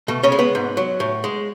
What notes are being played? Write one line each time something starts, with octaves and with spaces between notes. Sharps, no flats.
B2 A3
C#3 C#4
G#3
B3
G#2
F#3
A2
G#3